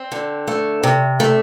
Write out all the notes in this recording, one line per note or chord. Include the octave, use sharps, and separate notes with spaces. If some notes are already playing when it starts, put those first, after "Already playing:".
Already playing: C4
D3
A3
C3
A3